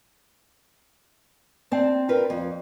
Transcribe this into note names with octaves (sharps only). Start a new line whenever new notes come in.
C4 D5 A5
F4 A#4 B4
F2